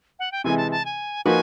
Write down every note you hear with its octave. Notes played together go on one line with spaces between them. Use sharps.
F#5
G5
C3 E3 G#3 G#5
A5
A5
G#5
F3 A#3 D#4 F#4 B4 G#5